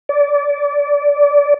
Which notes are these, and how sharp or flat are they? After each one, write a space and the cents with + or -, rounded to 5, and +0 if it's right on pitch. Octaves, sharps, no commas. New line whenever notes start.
D5 -25